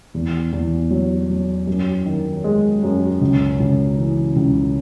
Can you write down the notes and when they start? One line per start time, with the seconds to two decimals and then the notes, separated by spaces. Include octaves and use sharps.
0.14 E2
0.52 E2
0.91 F#3
1.30 F#3
1.67 F#2
2.06 D#3
2.44 G#3
2.83 F#2
3.21 C#2
3.60 C#2
3.98 E3
4.36 C#2